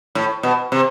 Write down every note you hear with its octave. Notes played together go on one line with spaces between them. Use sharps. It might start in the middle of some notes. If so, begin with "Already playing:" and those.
A2
B2
C3